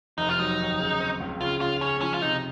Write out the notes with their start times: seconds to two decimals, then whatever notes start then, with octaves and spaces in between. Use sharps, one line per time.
0.18 F1 D#4
0.29 F4
0.38 F#3 D#4
0.59 D#2
0.79 C#3
1.00 C4
1.20 C#2
1.40 C#3 F4
1.60 C#3 F4
1.81 C#3 C#4
2.01 F3 C#4
2.14 F4
2.22 C3 D#4